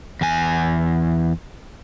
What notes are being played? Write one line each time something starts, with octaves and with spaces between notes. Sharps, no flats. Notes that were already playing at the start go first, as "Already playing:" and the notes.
E2 G#5